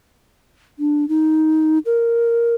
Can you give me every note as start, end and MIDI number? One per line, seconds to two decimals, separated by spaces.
0.79 1.08 62
1.09 1.78 63
1.86 2.55 70